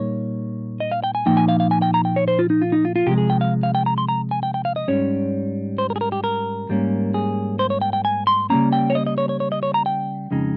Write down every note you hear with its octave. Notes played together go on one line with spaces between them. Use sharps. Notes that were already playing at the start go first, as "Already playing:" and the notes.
Already playing: A#2 G3 A#3 D#4 C#5
D#5
F5
G5
G#5
A#2 F3 A#3 D#4 G5
G#5
F5
F5
G#5
G5
A#5
G5
C#5
C5
F4
D#4
F4
D#4
F4
F4
C3 F3 G#3 G4
G#4
G5
F5
F5
G5
A#5
C6
A#5
G#5
G5
G5
F5
D#5
G#2 G3 C#4 C#5
C5
A#4
G#4
A#4
G4
A#4
G#2 G3 A#3 C#4
G#4
C5
C#5
G5
G5
G#5
C6
C#3 G3 A#3 C#4 A#5
G5
C#5
D#5
D#5
C#5
C#5
C#5
D#5
C#5
A#5
G5
F2 C#3 G#3 D#4